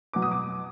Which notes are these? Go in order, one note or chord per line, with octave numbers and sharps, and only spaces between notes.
B2 F#3 D6
D#6
D6